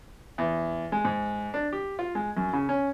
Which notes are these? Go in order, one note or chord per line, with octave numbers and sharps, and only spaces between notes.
E2
G#3
G#2
D4
G4
F4
G#3
F#2
C#3
C#4